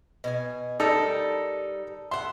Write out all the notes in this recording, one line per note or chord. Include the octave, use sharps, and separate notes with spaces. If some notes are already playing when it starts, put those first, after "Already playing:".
B2 G#4 G#5
G3 D#4 A4 A#4
E5 F#5 C6